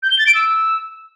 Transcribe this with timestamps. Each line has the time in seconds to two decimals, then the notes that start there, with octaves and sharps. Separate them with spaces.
0.03 G6
0.11 G7
0.19 A6
0.27 D7
0.35 E6